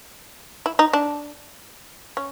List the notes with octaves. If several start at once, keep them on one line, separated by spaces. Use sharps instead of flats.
E4
D#4
D4
C#4